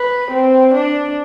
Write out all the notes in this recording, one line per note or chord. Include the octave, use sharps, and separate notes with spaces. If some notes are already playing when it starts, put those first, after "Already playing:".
Already playing: B4
C4
D4